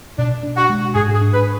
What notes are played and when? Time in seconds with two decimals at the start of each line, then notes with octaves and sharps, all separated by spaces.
0.18 B2 D4
0.43 D4
0.56 F#4
0.70 G#3
0.95 G#2 G#4
1.14 G#4
1.21 D4
1.34 B4